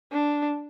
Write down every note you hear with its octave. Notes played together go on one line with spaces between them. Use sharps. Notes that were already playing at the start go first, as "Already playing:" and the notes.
D4